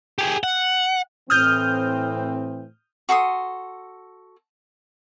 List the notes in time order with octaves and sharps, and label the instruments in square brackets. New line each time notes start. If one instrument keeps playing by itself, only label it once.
[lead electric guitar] G4 G#4
F#5
[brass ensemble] A2 E3 C4 [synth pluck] D#6 F6 G6
[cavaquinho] F#4 A4 C6 D#6